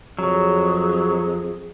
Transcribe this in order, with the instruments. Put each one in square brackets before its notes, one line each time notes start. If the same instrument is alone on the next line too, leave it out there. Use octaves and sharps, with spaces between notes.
[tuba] F2 [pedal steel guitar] F#3 [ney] G#4